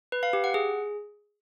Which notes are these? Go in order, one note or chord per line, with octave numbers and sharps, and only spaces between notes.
B4
F5
G4
F#5
G#4